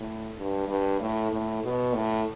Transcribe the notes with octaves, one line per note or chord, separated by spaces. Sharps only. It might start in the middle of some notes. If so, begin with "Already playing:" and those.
Already playing: A2
G2
G2
A2
A2
B2
A2